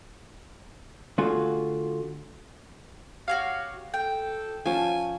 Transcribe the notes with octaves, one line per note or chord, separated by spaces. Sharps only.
D3 A3 F4 F#4 G#4
F#4 G4 C#5 F5
A4 G5
F3 C#4 G#5 A5